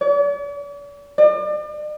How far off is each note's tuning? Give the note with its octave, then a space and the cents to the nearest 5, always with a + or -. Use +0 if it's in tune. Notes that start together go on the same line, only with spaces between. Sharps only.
D5 -45
D5 +40